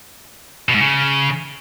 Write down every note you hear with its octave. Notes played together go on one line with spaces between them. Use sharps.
B2
G#2
C#3